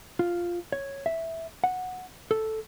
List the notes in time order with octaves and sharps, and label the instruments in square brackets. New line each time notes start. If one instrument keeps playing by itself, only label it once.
[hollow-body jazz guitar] F4
C#5
E5
F#5
A4